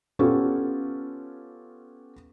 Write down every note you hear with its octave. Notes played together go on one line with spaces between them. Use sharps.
B3 C#4 F4 G4 A4 C#5